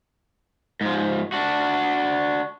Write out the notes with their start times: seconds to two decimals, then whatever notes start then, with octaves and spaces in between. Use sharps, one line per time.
0.81 G#2 F3
1.32 D4 F#4